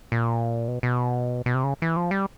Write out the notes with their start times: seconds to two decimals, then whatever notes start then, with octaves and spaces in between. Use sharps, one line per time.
0.12 A#2
0.68 B2
0.83 B2
1.46 B2
1.55 C3
1.64 C#3
1.82 E3
1.97 F3
2.11 G3